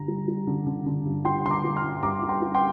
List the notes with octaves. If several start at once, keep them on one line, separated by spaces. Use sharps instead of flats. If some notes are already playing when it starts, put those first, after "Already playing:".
Already playing: G2 D3 A#5
G3
G3
D3
D3
D3
G2
G3 G5 C6
D3 C6
A#5 D6
G3
C6 F6
G2
G2 A#5 D6
G3
G5 C6
G3
G5 C6